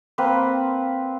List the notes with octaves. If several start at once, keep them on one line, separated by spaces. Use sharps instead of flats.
A#3 C4 B4